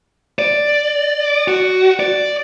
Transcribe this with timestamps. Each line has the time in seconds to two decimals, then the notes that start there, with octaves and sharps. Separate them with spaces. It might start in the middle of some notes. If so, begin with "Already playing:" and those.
0.39 D5
1.48 F#4
2.00 D5